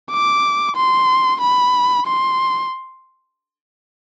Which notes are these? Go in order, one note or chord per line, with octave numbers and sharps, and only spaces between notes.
D6
C6
B5
C6